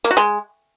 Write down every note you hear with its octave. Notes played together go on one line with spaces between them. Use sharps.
A#3
F#4
G#3